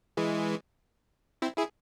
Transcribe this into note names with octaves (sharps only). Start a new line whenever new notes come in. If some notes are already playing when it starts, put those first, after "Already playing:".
E3 G#3
C4 E4
E4 G#4